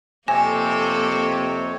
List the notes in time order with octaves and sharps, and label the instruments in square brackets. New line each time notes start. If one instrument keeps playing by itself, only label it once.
[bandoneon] F2 C4 C#5 [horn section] C3 [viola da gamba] A#3 A4 [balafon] G#5